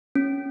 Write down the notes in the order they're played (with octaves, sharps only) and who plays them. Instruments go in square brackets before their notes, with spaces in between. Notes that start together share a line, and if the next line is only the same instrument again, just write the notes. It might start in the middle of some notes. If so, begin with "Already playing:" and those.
[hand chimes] C#4